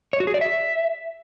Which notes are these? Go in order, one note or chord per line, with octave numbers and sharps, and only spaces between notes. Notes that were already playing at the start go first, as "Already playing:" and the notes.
C#5
F#4
G#4
D5
E5